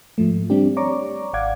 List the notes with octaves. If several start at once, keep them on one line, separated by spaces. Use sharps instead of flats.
G#2 F3 A3
G3 C4 D4 G4
C#5 D5 A#5 C#6 D6
G#1 D5 F5 F#5 D6 G#6